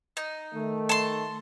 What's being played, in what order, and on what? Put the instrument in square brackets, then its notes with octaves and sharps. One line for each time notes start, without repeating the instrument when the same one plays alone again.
[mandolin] D#4
[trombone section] D#3 A3
[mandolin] A5 C6